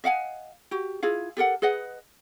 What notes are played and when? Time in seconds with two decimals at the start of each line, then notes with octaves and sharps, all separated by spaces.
0.04 D#5 F5 F#5 G#5
0.71 F#4 G4
1.03 E4 F4 G#4 F5
1.37 G4 A4 A#4 F#5
1.62 G#4 B4 D#5 F#5